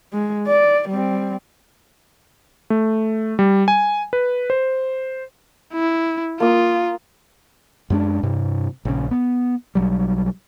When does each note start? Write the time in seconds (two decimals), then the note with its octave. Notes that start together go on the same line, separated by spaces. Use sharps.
0.13 G#3
0.47 D5
0.89 G3 C4
2.70 A3
3.39 G3
3.68 G#5
4.13 B4
4.50 C5
5.74 E4
6.40 A#3 F4 D#6
7.90 F#2 G#3 D4
8.23 G2 C3
8.85 A#1 C#3
9.11 B3
9.75 B1 F#3 G3